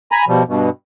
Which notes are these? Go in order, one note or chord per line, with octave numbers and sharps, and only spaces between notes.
G#5 A#5 B5
B2 F3 G3
G2 B2